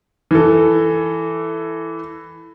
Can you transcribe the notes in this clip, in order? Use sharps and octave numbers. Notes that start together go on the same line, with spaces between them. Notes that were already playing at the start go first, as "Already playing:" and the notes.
E3 A4